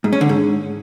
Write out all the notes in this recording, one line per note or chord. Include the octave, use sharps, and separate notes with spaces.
G#2
C#4
D3
G#2